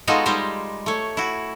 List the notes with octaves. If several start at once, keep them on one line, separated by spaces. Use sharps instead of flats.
G#3 B3 D#4 F4 F#4 A4
G3 G#3 D#4 G4 C5
A3 C#5
E4 F#4